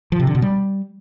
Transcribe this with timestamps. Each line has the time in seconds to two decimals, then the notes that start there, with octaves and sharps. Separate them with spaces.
0.12 F3
0.20 C3
0.27 D3
0.35 B2
0.42 G3